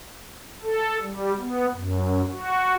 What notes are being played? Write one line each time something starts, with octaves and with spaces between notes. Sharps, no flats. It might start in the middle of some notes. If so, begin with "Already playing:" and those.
A4
G3
B3
F#2
F#4